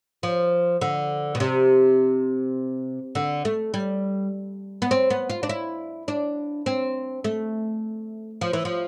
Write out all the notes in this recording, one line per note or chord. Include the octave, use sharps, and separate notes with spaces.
F3
D3
B2
C3
D3
A3
G3
B3
C4
B3
F4
D4
E4
D4
C4
A3
F3
E3
F3